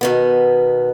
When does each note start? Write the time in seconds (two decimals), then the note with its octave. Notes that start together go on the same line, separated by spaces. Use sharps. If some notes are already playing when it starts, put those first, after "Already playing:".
0.01 B2 D#3 B3